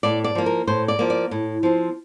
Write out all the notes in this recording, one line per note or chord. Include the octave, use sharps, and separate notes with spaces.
A2 D5
D5
F3 A#3
A#4
A2 C5
D5
F3 A#3
D5
A2
F3 C4